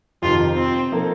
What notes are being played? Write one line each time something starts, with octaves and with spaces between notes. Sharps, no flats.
F2 C3 D#3 F4
C4
F3 A#3 D#4 A4